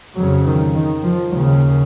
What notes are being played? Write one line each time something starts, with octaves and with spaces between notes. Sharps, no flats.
F2 C#3 F#3
D#3
D#3
F3
D#2 C#3 F#3